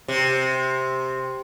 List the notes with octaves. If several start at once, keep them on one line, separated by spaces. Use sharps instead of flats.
C3